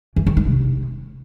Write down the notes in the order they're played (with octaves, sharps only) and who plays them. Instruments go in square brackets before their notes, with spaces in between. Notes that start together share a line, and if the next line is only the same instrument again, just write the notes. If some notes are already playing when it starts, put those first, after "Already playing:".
[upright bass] E3
D#3
D#4
C3